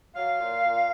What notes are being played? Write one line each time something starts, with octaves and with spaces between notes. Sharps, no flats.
F#3 F5
A#2
A#2